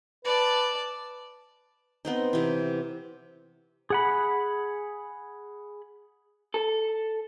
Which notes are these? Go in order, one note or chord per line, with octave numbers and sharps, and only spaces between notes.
B4 D5 A5
B3 C4 D#4
C3 E3
G#4 F#5 B5
A4